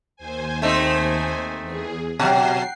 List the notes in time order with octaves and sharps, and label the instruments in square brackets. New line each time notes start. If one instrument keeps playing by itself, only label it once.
[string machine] D#2 C5 G#5
[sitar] A3 C4 D#4
[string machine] E2 G#4
[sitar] B2 F#3 [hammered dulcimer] F#5 G5 A#5 [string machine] C7